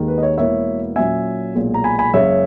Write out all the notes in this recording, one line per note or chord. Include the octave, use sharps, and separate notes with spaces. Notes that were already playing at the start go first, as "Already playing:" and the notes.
Already playing: D#2 D#3 G#3
B4
D#5
C#5
E1 E2 B2 A#3 E4 C#5 E5
A#2 F#3 C#4 E5 G#5
B1 A#2 G#3
A#5
G#5 B5
G#5 B5
F#1 F#2 C#3 G#3 C#4 C#5 E5